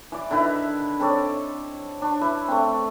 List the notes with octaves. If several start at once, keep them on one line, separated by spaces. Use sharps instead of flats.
E3 D5
D3 D#3 E4 B4
C4 A4 C#5 D5
D4 C#6
E4 B4
A3 C4